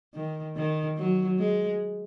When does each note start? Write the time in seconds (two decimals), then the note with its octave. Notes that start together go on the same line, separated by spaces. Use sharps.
0.14 D#3
0.56 D#3
0.97 F#3
1.39 G#3